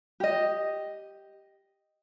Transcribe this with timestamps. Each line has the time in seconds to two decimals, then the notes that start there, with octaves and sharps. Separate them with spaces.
0.20 G4 D#5